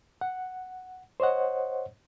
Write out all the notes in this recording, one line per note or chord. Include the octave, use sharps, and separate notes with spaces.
F#5
C5 C#5 D#5 F#5